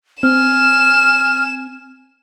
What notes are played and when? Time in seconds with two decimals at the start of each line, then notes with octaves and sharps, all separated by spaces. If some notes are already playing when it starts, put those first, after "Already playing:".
0.23 C4 G#5 F6 E7